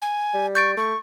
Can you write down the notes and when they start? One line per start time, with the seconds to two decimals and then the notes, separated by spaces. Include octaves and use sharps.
0.02 G#5
0.34 G3
0.55 C#6 G6 A6 D7
0.77 A3 C#6